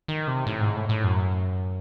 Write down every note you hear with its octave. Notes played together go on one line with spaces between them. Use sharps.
D#3
C3
A2
G#2
A2
A2
F#2